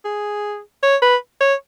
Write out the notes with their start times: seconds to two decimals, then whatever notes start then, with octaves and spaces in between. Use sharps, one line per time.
0.05 G#4
0.83 C#5
1.02 B4
1.40 C#5